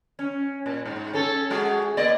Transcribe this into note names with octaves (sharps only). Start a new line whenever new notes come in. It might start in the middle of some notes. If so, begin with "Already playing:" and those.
C#4
A#2
G#2
C#4 A4
G#3 F#4 G#4
A#3 D5 D#5